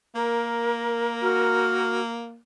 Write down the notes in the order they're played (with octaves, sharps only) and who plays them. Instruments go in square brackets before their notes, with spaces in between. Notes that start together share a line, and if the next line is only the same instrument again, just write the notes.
[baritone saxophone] A#3 [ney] A#4
[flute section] F#4 F6